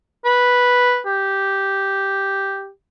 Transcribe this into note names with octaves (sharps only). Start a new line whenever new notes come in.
B4
G4